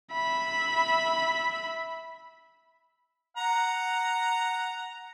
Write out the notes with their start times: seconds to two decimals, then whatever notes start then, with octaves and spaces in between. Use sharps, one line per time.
0.12 E5 B5
3.37 F#5 A#5